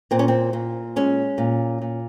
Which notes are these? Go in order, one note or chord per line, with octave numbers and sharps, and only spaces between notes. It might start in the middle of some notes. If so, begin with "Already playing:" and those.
A#2 C4
C#4
C4
A#2
G#3 C#4
A#2
A#2